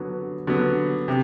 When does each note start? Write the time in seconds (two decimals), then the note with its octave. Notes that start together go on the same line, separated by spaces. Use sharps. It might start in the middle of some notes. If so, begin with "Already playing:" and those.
Already playing: D3 F#3 B3
0.47 D3 F#3 B3
1.08 C3